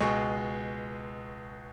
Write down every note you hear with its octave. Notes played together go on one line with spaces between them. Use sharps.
C#2 B2 G#3 G#5 C#6